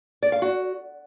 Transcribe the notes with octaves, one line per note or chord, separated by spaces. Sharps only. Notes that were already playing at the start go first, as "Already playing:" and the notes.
D5
F5
F#4